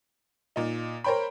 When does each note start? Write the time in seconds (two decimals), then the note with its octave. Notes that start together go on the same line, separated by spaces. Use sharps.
0.56 A#2 D#4
1.04 A#4 C5 C#5 G5 B5